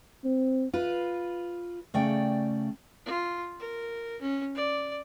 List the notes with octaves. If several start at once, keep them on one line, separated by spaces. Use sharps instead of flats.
C4
F4 B4
C#3 A3 D5 G5
F4
A#4
C#4
D5